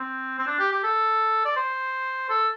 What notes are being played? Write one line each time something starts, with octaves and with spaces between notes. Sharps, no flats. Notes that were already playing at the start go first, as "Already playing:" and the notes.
Already playing: C4
C4
D4
G4
G4
A4
D5
C5
A4